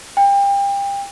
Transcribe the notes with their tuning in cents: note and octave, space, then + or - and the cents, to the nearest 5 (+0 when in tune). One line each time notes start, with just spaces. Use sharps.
G5 +30